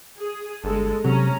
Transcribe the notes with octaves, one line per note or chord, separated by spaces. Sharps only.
G#4
G1 G#3 A4
C3 F#3 C#4 A#5